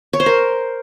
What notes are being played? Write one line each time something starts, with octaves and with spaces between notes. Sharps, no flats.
C#5
C5
A#4